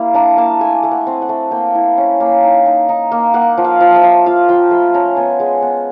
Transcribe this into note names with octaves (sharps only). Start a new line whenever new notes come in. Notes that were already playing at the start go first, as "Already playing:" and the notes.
Already playing: G3 A#3 E4
D4 A#5
A#3 A5
A3 G#5
A3
F#5
C4
F#5
A3
A#3 G5
E4
C#4
A#3
D#4
D#4
D#4
A#3
A#3 F#5
F3
F5
F3
E5
F3
F4 F5
F3 G5
A3 B5
C#4 A#5
B3 G#5
G#3
B3